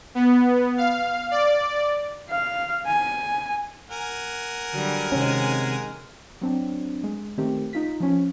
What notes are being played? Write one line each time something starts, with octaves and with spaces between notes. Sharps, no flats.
B3
F5
D5
F5
G#5
A#4 F#5 G#5
D3 F#3 G3
C3 D#3 G#3 C4 C#4
F#3 C4 D4
G#3
D#3 A3 C4 G4
D#4 F4 B6
F3 C#4